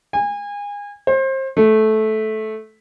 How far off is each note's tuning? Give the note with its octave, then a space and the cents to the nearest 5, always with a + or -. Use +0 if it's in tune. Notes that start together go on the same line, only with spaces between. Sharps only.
G#5 -30
C5 +30
A3 -15